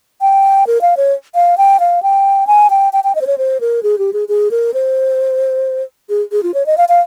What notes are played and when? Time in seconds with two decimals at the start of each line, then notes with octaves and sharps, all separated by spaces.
0.21 G5
0.67 A#4
0.81 F5
0.97 C#5
1.35 F5
1.58 G5
1.80 F5
2.03 G5
2.47 G#5
2.70 G5
2.93 G5
3.04 G5
3.15 D#5
3.21 C5
3.27 C#5
3.38 C5
3.61 A#4
3.83 G#4
3.99 G4
4.13 G#4
4.29 G#4
4.51 A#4
4.74 C5
6.09 G#4
6.32 G#4
6.43 F4
6.54 C#5
6.66 D#5
6.78 F5
6.89 F5